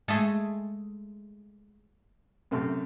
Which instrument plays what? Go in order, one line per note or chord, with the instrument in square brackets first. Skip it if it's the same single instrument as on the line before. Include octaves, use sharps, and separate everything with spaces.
[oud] G#3 [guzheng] A3 G#4 A4
[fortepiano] F#2 C3 A3